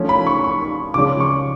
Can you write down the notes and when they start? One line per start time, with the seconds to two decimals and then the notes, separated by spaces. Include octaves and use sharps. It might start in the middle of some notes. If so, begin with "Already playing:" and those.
Already playing: F3 A3 C#4
0.09 B5
0.27 C#6
0.44 C#6
0.94 C#3 F3 G#3 C#4 D6
1.20 C#6